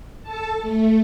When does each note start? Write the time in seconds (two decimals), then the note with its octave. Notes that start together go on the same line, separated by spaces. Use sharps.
0.23 A4 A5
0.61 A3